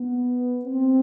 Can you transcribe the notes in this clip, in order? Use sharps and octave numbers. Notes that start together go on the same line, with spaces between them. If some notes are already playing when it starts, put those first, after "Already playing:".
Already playing: B3
C4